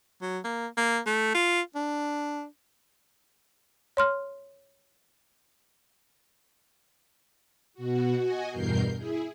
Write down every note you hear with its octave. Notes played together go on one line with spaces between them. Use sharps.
F#3
A#3
A#3
A3
F4
D4
C#5 C6 F6
B2 F#4
F#4 D#5 G#5
E2 G2 B2 A#4 G6 C7
E4 G#4